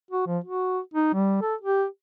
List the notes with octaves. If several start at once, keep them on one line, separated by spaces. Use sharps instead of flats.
F#4
F3
F#4
D#4
G3
A4
G4